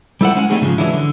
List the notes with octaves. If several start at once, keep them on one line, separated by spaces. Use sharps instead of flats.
G3 B3 E4 A4 C5 F#5
G#3 C#4 E4 F#5
G3 A3 C4 D#4 G#4
G#2 C#3 F3 F#3 G#3
E3 F#3 G#3 C#4 D4 E4
D3